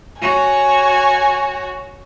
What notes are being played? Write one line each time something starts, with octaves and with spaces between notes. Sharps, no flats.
F#4 C#5 G#5